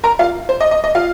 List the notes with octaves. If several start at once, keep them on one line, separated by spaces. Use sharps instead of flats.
A#4 A#5
F4 F5
C5
D#5
D#5
D#5
F4 F5